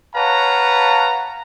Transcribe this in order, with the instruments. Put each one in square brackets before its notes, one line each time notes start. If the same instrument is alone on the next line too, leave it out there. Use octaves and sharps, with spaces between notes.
[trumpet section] B4 C#5 F5 F#5 A5 A#5